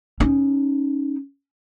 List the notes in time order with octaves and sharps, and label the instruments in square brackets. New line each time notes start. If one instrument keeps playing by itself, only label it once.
[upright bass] C#4 D#4